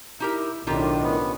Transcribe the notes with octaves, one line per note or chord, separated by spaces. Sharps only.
D#4 E4 G4 A#4
B1 A2 D#3 D4 D#4 F4 G4
B3 C#4